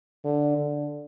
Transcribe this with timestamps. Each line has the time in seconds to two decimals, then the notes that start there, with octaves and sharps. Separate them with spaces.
0.24 D3
0.57 D3